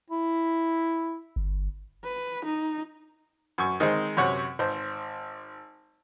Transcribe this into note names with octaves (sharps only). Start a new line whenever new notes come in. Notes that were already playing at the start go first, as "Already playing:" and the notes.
E4
G1
B4
D#4
F#2 C#6
D#3 G#3 C4 D#4 G#4
F#2 C3 C#5 F#5
G#1 C5